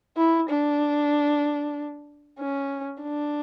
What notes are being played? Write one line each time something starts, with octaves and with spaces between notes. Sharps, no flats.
E4
D4
C#4
D4